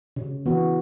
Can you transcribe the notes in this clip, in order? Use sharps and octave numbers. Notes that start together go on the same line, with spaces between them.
C#3
E3 B3 F#4